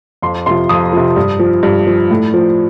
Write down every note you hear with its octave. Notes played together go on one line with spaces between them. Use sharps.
F2 C6
C3 F3 C6
F2 D#6
C3 F3
G2
F3
G2
F3
A2
F3